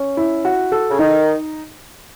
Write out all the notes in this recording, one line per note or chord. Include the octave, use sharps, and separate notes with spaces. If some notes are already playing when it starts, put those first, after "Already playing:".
Already playing: C#4
E4
F#4
A4
C#3
D#3 D#4